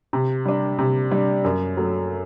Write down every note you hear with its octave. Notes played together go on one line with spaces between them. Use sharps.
C3
G3 D4
C3
G3 D4
F#2
F#3 A3